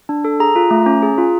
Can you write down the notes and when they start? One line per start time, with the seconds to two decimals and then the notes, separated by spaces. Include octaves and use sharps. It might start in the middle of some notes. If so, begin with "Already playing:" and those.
0.09 D4
0.25 A4
0.40 G#4 A#5
0.56 F4
0.71 A3
0.86 C#4
1.03 G#4
1.18 F4